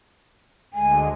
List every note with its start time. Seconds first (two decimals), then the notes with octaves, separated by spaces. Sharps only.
0.73 D2 D3 G#3 G#5